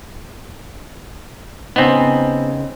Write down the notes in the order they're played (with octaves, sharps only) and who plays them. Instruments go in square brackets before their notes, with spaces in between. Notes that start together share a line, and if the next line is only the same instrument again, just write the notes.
[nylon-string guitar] C#3 D#4 [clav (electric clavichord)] B3 C4